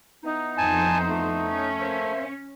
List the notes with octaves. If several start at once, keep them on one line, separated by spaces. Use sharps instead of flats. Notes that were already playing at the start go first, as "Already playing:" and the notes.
E3 B3 D#4
F2 C5 G#5 A5
A3
C#4
A#3 C5 E5